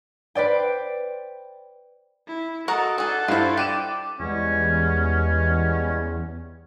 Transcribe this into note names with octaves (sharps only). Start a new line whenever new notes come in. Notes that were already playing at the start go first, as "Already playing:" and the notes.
B4 C5 D5 G5
E4
F#4 A4 A#4 D#5 F#5
D4 G#4 A4 F#5
G2 D4 E4 F4 C5
G4 D5 F#6 D#7 E7
E2 G3 G#3 B3 C#4